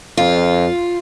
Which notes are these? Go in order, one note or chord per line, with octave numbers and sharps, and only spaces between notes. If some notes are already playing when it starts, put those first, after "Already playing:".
F2 F4